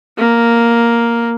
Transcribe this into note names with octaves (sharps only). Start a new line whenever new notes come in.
A#3